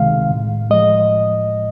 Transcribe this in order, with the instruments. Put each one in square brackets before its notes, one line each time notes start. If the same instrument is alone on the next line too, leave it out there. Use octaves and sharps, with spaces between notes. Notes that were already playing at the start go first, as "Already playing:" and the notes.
Already playing: [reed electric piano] C#2 C3 D#3 G#3 F5
A2
F3 G#3 D#5